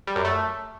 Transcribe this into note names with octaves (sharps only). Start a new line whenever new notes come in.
G3
F#2
A3